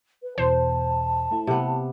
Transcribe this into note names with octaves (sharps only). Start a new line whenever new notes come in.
B4
E2 B2 E3 C5 A5
A3 E4
C3 B3